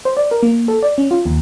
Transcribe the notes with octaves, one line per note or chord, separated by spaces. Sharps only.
C5
D5
A#4
A#3
A4
D5
C#4
F4
D#2